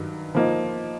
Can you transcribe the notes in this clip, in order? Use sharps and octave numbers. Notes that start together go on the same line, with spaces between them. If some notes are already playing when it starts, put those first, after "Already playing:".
Already playing: G2 D#3 F#3
F3 A#3 D#4